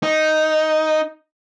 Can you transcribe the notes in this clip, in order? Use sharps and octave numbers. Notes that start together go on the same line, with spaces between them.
D#4